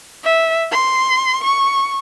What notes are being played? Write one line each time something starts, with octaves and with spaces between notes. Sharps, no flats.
E5
C6
C#6